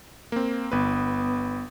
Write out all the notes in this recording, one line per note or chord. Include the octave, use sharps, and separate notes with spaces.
A#3 C4
G1 B3 B4